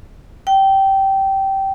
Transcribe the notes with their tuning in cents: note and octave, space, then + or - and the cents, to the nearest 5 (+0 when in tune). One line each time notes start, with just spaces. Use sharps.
G5 -15